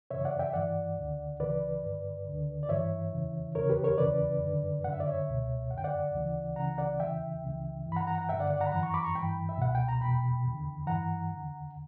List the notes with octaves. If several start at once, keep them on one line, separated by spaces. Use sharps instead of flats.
F#2 C#3 E3 C#5 E5
D5 F#5
E5 G5
E5
G2 E3 D5 F#5
D2 D3
C#2 C#3 E3 B4 D5
G2 D3
D2 D3
D5
G2 E3 C#5 E5
E2 C#3 E3
E2 C#3 E3 A#4 C#5
G4 B4
A#4 C#5
E2 C#3 E3 B4 D5
F#2 D3
F#2 D3 F#5
E5
D5
C#5 E5
C#2 B2
F#2 D3 F#5 G5
D5 F#5
D2 C#3 E3
C#2 C#3 E3 F#5 A#5
D5 F#5
E2 C#3 E3 E5 G5
C#2 C#3 E3
G2 E3
B5
F#5 A#5
F#5 A#5
F#5 A#5
G2 D3 E5 G5
D5 F#5
D5 F#5
F#5 A#5
B5
F#2 E3 F#5 A#5
A#5 C#6
B5 D6
A#5 C#6
G2 E3 G5 B5
E5
C#2 B2 F#5
G5
A#5
E2 B2 G5 B5
E2 D3
G2 E3 F#5 A#5
E2 D3